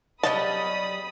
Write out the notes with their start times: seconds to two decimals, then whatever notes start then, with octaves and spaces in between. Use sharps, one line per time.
0.23 F#3 G3 D#5 A5 B5 D#6